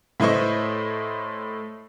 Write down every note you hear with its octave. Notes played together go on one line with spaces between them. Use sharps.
A2 E4 B4 C5 D#5 C#6